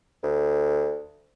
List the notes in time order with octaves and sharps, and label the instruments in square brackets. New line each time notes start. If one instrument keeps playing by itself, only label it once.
[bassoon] D2